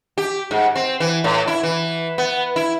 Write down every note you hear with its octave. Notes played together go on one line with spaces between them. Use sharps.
G4
G#2
C4
E3
A2
E4
E3
B3
E4